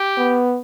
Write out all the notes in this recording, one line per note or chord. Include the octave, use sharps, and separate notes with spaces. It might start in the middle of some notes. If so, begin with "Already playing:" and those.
Already playing: G4
B3